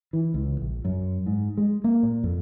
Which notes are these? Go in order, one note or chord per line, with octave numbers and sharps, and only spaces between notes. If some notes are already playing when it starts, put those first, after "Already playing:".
E3
C#2
A#1
F#2
G#2
G#3
A#3
A#2
F2